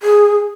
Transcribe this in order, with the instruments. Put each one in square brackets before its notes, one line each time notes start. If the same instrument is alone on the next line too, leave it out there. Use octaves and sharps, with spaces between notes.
[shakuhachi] G#4